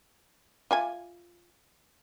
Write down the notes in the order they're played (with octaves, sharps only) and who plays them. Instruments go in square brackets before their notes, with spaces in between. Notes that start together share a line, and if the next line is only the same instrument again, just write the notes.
[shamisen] F4 E5 G#5